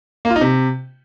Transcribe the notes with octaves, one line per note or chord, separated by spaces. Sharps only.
A#3
F4
D#4
C3